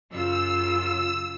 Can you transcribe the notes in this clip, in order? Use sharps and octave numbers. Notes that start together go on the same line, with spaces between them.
F#2 C#3 F4 E6